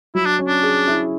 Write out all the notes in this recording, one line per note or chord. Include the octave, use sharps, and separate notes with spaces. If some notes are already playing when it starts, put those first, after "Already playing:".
F#3 E4
D4
C#4
D4
G#4
E4